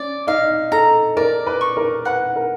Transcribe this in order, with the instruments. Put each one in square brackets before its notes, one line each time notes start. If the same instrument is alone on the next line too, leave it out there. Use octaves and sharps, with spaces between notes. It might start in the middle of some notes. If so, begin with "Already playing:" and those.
Already playing: [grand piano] C#4 [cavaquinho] D5
[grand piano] D#4 [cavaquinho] F5
[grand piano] A4 [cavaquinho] A#5
[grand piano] A#4 [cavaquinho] D5
[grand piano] B4
[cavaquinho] C#6
[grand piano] A#4
[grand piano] B4 [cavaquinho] F#5
[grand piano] A#4